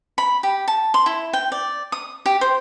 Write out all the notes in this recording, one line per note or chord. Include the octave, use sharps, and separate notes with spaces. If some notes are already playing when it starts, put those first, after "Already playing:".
B5
G4
A5
C6
E4
G5
D5
D#6
G4
C5